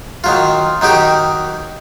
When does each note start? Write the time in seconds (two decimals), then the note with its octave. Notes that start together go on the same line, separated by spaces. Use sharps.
0.24 D#3 F#3 F4
0.81 D#3 F#3 D#4 G4